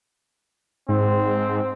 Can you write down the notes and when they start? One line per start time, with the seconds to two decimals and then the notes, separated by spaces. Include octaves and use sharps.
0.89 G#2 C4